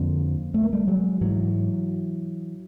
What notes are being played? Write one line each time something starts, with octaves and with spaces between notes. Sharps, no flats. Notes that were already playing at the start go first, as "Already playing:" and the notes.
Already playing: F2 D3 A#3 C4
A3
A#3
G3 A3
F#3 G#3
G#2 E3 F#3